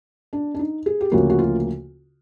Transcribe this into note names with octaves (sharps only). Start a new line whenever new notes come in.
D4
D4
D#4
G#4
G4
D2 C#3 F3 A#3 F#4
F#4
F4